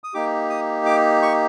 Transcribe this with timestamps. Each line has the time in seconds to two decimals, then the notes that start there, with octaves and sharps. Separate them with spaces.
0.04 D#6
0.14 A#3 D#4 G4 D6
0.50 D#6
0.86 D6
1.22 C#6